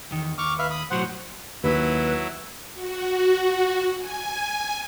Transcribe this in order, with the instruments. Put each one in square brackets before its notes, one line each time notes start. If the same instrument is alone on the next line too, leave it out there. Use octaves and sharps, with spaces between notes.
[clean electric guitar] E2 D#3
[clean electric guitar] D#2 [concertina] C#6 D6 F6
[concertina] B4 E5 F5
B5 D#6
[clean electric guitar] B1 A2 F#3 [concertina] C5 F#5
[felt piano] D#2 [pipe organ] F#3 E4 [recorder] B4
[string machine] F#4
G#5